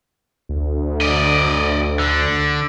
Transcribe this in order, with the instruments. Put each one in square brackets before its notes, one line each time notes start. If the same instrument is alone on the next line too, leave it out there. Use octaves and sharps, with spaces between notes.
[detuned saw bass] D2
[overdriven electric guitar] D5 D#5
D3